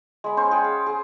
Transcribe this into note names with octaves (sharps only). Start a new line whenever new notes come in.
G#3 B5
C#4 C5
G#4 F#5 G5
F5
G#4